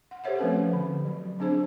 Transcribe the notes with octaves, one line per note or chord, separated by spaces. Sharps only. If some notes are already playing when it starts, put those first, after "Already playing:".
F#5
G4 A4 C5 C#5 E5 F#5
F3 A3 C4 C#4 B4
D3
F#3
F#3 C4 D4 G#4 C5